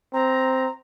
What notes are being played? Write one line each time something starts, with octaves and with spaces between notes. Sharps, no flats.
C4 A#5